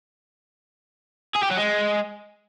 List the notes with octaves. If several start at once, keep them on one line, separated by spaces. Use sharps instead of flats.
G#4
G4
F#3
G#3